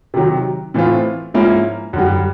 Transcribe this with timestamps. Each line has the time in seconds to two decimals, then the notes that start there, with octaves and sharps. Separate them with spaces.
0.14 C3 D#3 F#3
0.74 A2 E3 A3 C4 F4
1.34 G#2 F3 A#3 C#4 E4
1.93 F#2 D3 G3